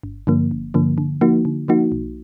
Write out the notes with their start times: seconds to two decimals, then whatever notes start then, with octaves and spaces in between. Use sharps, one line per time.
0.03 G1
0.27 G2 D3 F3 A#3
0.51 G1
0.74 G2 D3 F3 A#3
0.98 D3
1.21 F3 A#3 D#4 F#4
1.45 D3
1.68 F3 A#3 D#4 F#4
1.92 B1